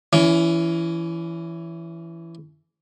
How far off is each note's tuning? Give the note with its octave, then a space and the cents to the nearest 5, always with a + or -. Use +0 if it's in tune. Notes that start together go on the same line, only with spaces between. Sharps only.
E3 +15 C#4 +30